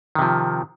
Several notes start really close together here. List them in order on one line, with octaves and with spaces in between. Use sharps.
D#3 C3 F3